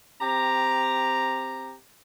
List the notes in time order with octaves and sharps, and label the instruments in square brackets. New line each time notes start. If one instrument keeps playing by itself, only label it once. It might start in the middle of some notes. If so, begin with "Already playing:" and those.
[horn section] C4 G4 A#5